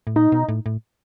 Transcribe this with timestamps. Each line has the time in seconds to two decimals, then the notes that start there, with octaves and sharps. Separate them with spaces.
0.07 A2
0.16 A#2 D#4
0.32 B2
0.49 A2
0.66 A2